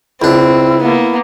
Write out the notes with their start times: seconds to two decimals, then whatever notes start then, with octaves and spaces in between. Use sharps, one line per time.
0.22 C#2 C4 D4 E4
0.82 A#3 B3